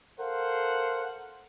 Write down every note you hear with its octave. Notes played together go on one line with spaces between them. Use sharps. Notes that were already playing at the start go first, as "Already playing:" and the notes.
A4 A#4 C5 F5 F#5